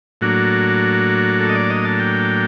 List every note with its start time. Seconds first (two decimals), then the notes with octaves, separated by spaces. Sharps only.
0.21 A2 F#3 A#3 D4 F#4
1.40 A4
1.49 D#5
1.55 D5
1.70 D#5
1.85 A5
1.99 G5